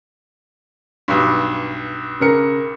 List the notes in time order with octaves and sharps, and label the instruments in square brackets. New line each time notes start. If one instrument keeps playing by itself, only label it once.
[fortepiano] B1 G2
[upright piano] C#3 A#4 C#7